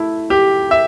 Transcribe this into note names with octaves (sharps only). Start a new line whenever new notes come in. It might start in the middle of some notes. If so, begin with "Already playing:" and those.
Already playing: A3 E4
G4
E5